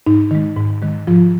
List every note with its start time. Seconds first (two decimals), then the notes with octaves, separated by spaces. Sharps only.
0.06 G#2 D#4
0.31 D#3 G#3
0.57 G#2
0.82 D#3 G#3
1.07 G#2 F3 F4